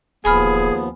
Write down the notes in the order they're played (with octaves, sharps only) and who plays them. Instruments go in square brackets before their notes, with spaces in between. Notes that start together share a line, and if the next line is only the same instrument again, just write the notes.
[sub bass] D1 [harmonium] D#2 F3 B3 [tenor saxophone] G#4 [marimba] G#5 B5 F6